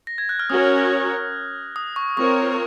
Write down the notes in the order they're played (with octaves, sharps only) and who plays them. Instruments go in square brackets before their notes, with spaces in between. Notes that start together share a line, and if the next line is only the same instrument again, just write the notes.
[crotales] A#6
G#6
F#6
F6
[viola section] C#4 F#4 A#4 C#5 [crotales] D#6
[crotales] F6
F#6
D#6
C#6
[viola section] C4 F4 A#4 C#5 [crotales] C#6